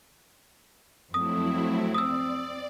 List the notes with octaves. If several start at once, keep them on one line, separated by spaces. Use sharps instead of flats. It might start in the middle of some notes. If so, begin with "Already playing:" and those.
F2 F#3 A3 C4 E4 D#6
D5 D#6 E6